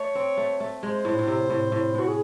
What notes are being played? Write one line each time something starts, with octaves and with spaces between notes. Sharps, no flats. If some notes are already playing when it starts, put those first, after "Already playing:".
Already playing: A3 C#5
C4
A3
A3
G#3 C5
A2
A2
C3
A2
A2
A2 F#4
G#4